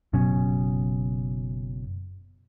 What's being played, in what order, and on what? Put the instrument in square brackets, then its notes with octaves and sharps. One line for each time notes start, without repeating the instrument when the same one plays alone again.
[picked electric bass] F#1 B2 F#3 C#4